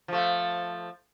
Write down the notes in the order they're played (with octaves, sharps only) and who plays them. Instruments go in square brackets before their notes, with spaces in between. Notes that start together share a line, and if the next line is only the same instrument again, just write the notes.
[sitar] F3 A3